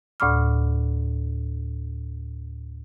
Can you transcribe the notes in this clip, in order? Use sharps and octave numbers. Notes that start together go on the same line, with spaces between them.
D2 A2 D5 B5 D6 F6